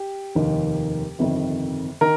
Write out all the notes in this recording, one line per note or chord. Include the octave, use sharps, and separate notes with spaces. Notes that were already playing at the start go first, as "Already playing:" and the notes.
Already playing: G4
F1 D#2 D#3
G1 F2 C3 D#3
D#3 A#4